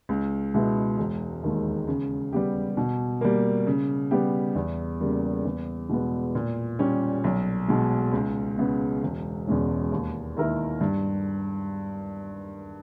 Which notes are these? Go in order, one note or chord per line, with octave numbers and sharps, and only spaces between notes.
C#2
B2 G#3 B3 E4
E1
D#2 D#3 G#3
C#3
G3 B3 G4
B2
G3 A#3
C#3
G3 B3 G4
E2
C#3 G3 A#3
E2
B2 G#3 B3
A#2
G3 C#4 G4
B1
B2 G#3
C#2
C#3 G#3 B3
E1
E2 B2 G#3 C#4
D#2
D#3 A#3 E4 A#4
G2